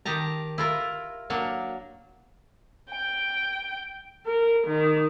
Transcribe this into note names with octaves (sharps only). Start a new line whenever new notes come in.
D#3 G4 A5 A#5
E4 F4 A#4
F#3 A#3 D4
G5
A#4
D#3